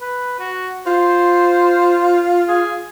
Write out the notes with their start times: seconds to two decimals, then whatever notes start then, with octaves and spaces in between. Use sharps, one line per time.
0.01 B4
0.39 F#4
0.87 F4 C5
2.48 G#4